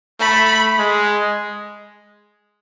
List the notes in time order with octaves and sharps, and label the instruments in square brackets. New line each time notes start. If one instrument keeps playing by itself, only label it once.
[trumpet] A3 [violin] B5
[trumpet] G#3